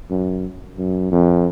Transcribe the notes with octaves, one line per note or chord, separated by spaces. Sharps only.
F#2
F#2
F2